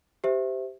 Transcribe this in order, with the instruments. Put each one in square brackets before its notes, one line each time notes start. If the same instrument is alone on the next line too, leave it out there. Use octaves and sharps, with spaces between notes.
[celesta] G4 C5 E5